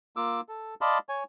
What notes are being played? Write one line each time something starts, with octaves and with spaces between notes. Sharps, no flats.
A#3 F4 D6 E6
A4
D5 D#5 F5 A5 B5 C6
C#5 G#5